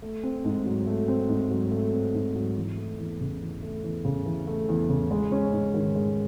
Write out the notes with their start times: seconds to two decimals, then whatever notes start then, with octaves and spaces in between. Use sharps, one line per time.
0.02 A3
0.23 C4
0.45 G#2
0.66 F#3
0.87 A3
1.08 C4
1.29 G#2
1.51 F#3
1.71 A3
1.93 C4
2.14 G#2
2.35 F#3
2.57 E3
2.78 A3
2.99 E2
3.20 C#3
3.41 E3
3.62 A3
3.84 E2
4.04 C#3
4.26 E3
4.47 A3
4.69 E2
4.89 C#3
5.11 G#3
5.32 C#4
5.53 G#2
5.74 D#3
5.95 G#3